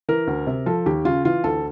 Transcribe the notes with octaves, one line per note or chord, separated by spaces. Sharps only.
E3 A#4
D2
C3
F3 A4
D#2 G4
C#3 F4
E3 F4
D2 A4